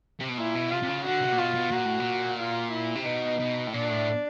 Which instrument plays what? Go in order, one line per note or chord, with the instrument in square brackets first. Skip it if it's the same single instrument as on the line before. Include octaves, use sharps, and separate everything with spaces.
[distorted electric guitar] C3
B2
[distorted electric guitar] A#2 [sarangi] E4
[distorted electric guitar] B2
[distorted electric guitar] C3 [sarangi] F4
[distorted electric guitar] C3
C#3
[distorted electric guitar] D3 [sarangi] F#4
[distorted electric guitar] C3
A#2
[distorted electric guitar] B2 [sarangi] F4
[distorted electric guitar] B2
[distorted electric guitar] A#2 [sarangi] F#4
[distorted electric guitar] A2
A#2
[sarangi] F4
E4
[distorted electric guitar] C3
[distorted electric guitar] B2 [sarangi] D#4
[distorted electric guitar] B2
A2
[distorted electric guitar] A#2 [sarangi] D4
[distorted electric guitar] A2